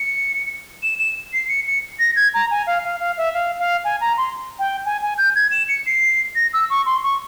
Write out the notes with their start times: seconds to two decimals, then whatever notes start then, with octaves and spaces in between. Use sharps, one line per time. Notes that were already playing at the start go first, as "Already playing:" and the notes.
Already playing: C#7
0.83 E7
0.99 E7
1.33 C7
1.49 C#7
1.67 C#7
1.99 A#6
2.16 G#6
2.34 A#5
2.51 G#5
2.67 F5
2.84 F5
3.00 F5
3.18 E5
3.34 F5
3.59 F5
3.85 G#5
4.01 A#5
4.17 C6
4.59 G5
4.86 G#5
5.02 G#5
5.18 G6
5.36 G#6
5.51 E7
5.69 C#7
5.86 C7
6.35 A#6
6.53 E6
6.70 C#6
6.86 C6
7.04 C#6